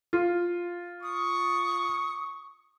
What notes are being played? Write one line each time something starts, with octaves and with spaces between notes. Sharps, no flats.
F4
C#6 D#6